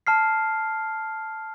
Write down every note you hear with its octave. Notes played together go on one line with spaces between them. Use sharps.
A5 F6 C7